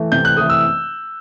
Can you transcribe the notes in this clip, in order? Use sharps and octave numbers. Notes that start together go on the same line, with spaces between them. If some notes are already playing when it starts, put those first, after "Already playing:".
Already playing: E3 A3
C3 G6
F#6
E3 A3 D#6
E6